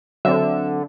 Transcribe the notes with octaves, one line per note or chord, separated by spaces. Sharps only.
D3 F#3 C4 E5